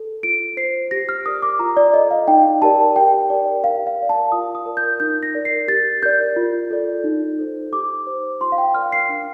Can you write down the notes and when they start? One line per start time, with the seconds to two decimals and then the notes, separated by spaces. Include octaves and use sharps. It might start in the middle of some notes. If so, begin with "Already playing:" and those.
Already playing: A4
0.23 F4 D7
0.57 C5 C7
0.91 G4 A#6
1.09 F6
1.26 A#4 D5 D#6
1.42 D6
1.59 F4 A#5
1.77 D5
1.94 A4 D5 D#5
2.11 F5
2.28 D#4 G5
2.62 G4 A#4 D5 A5
2.96 G4 G5
3.30 A#4 D5
3.64 G4 F5
3.87 F5
3.97 A#4 D5
4.09 A5
4.32 F4 D#6
4.55 D#6
4.66 A#4 D5
4.77 G6
5.00 D#4 G6
5.23 A#6
5.34 A#4 D5
5.45 C7
5.68 G4 A6
6.03 A#4 D5 G6
6.36 F4
6.71 A4 D5
7.04 D#4
7.39 A4 C5
7.72 G4 D6
8.07 C5
8.41 F4 C6
8.52 F5
8.58 G5
8.75 A#4 D5 F6
8.92 C7
9.09 D4